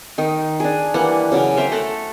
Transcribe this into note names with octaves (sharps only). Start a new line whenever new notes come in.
D#3 D#4
D4 G#4
E3 G3 A#3 F#5
C#3 F#3 A#4
A#4 C5 E5 G5
A3 A4 F#5 A#5